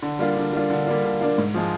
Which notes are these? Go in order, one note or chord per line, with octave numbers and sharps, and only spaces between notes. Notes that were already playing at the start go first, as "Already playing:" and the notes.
D3
G3 A#3 D4 F4
D3
G3 A#3 D4 F4
D3
G3 A#3 D4 F4
D3
G3 A#3 D4 F4
G#2
F3 G#3